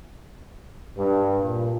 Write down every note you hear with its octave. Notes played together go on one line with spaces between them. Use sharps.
G2
A#2